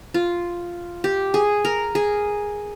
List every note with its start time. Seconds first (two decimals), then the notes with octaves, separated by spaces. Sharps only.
0.14 F4
1.04 G4
1.34 G#4
1.65 A#4
1.95 G#4